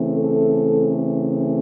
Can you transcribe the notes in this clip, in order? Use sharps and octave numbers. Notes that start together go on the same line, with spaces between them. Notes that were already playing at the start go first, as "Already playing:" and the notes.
Already playing: C#3 E3 A3 C4
A4